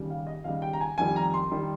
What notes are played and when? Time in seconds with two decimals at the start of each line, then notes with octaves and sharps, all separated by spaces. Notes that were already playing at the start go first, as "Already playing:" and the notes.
Already playing: D#2 C#3 G3
0.10 F5
0.27 D#5
0.44 D#2 C#3 G3 F5
0.62 G5
0.73 A#5
0.81 G#5
0.98 F2 D#3 G3 G#5
1.16 A#5
1.34 C6
1.51 D#3 G3